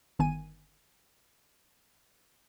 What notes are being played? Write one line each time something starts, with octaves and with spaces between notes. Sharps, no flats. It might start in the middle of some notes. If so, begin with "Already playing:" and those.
G1 D#3 B3 G#5 D#7